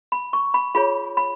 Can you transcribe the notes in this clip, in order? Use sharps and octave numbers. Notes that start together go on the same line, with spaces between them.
B5
C#6
B5
F4 G#4 C#5 B5
B5